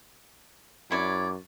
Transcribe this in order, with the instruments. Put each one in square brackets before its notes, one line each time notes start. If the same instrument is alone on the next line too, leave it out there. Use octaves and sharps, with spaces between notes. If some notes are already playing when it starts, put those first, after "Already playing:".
[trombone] F#2 [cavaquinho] E4 C#5 D5